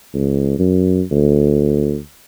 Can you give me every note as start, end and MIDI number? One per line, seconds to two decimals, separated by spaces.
0.14 0.58 37
0.59 1.02 42
1.11 1.98 38